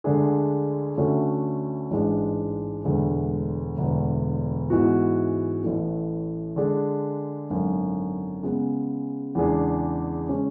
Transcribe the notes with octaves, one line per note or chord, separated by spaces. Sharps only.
D2 D3 G#3 D4 G#4
D2 D3 A3 C#4 F#4
A1 G#2 G#3 D4
E1 D2 D3 G#3
E1 D2 D3
G#2 E3 G#3 B3 F#4
A1 A2 E3 A3
D3 G#3 D4 G#4
G#1 F#2 D3
C#3 G#3 B3
E2 C#3 G#3 D4 G#4
C#3 G#3 C#4